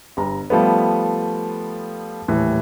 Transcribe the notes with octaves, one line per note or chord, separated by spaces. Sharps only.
G1 A#5
F3 G3 A3 B3
D#1 A2 E3